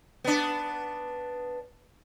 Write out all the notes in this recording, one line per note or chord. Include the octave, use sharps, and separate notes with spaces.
B3 D4